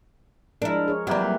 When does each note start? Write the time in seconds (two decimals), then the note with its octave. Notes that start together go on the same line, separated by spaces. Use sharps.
0.62 F3 G#3 D4 E4 A#4
0.88 G#4 C#5
1.07 C3 E3 F#3 G3 A#3 G4 B4